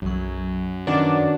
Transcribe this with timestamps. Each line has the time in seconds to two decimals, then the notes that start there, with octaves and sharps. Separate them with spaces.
0.02 B1 F#2 F#3
0.87 D#3 C#4 D4 F#4 B4